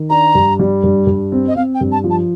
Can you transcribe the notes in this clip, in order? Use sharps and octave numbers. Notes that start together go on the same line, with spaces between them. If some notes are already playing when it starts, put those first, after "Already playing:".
Already playing: D#3
D4 A#5
G2
G3
G2
G2
C4
D#5
C4 F5
G5
G2
A5
F3
A5